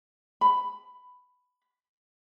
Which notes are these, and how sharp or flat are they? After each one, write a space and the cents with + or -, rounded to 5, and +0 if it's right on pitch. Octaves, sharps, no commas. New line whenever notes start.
B5 +10